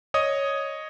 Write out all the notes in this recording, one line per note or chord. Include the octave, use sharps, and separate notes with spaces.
C#5 D#5 D#6